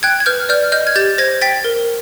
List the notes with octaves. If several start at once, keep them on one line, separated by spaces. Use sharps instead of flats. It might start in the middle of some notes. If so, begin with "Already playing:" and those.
G5 F#6 G#6
G#6
B4 F6 G6
D5 F6 G6
D#5 F6 G6
G#6
G4 G6 A6
C5 G#6 A#6
G5 A6 B6
A#4